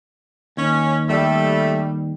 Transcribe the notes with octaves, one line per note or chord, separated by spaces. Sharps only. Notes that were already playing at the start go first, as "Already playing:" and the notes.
D#2 C#4
G3 A3 A4 E5